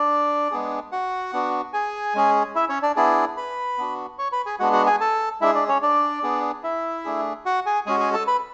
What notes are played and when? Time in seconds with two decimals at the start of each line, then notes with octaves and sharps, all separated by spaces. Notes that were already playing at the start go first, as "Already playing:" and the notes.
Already playing: D4 D5
0.51 G#3 B3 D4 G#4
0.92 F#4 F#5
1.33 B3 D4 F#4
1.73 G#4 G#5
2.15 G#3 C#4 G#4
2.55 E4 E5
2.69 C#4 C#5
2.82 D4 D5
2.96 B3 D4 E4 G#4 D5
3.37 B4 B5
3.78 B3 D4 F#4
4.19 C#5 C#6
4.32 B4 B5
4.46 G#4 G#5
4.59 G#3 B3 D4 F#4 F#5
4.73 F#4 F#5
4.87 G#4 G#5
5.00 A4 A5
5.41 G#3 D4 E4 G#4 E5
5.55 D4 D5
5.68 C#4 C#5
5.82 D4 D5
6.23 B3 D4 G#4
6.63 E4 E5
7.05 A3 D4 G#4
7.46 F#4 F#5
7.66 G#4 G#5
7.86 G#3 C#4 F#4 G#4 G#5
8.00 G#4 G#5
8.14 A4 A5
8.27 B4 B5